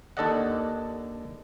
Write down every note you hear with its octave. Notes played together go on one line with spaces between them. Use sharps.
D#2 D4 A4 D5 D#5 F#5